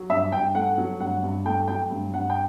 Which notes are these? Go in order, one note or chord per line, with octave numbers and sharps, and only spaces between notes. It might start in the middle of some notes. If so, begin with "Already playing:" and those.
Already playing: F#3
G2 E5
G2 G5
A3 F#5
F#3
G2 F#5
G2
A3 G5
F#3 G5
G2
G2 F#5
G5